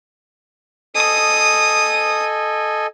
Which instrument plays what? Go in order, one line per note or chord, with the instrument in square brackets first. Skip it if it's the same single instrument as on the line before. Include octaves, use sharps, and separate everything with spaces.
[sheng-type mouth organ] A4 D#5 G#5 [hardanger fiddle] D#6